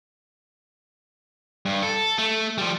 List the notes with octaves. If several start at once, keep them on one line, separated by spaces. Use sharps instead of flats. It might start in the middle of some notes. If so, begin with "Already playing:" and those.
G2
A4
A3
F3 G3